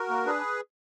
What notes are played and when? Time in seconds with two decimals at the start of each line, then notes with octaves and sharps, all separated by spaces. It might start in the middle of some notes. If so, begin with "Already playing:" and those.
Already playing: F#4 A#4
0.10 A#3
0.26 D4 G#4 B4